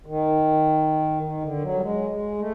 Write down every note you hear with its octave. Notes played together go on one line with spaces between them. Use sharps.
D#3
D#3
D3
F#3
G3
G#3
G#3
A3